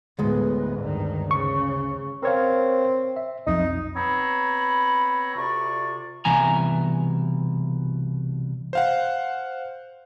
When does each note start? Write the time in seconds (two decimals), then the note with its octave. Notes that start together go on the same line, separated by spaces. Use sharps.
0.19 D2 A2 G#3 B3
0.79 G2 D#3
1.31 C#3 C#6
2.23 C4 A#4 C#5 F5
3.16 E5
3.47 B1 F2 D#4
3.95 B3 C4 C#5 A#5 B5
5.36 D2 C3 F4 D5 C#6
6.25 C2 B2 E3 G#5 A#5
8.73 C5 F5 F#5